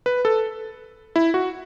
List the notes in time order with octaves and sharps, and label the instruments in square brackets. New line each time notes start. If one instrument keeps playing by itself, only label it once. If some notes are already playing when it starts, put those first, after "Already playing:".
[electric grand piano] B4
A4
E4
F#4